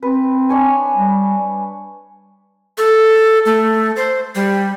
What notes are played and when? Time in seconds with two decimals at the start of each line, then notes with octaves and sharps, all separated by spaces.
0.03 C4 B4
0.49 D4 C#5 G#5
0.95 G3
2.78 A4
3.46 A3
3.96 C5
4.35 G3